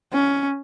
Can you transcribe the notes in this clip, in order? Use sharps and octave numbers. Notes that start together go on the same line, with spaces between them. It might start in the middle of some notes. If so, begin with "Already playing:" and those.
C#4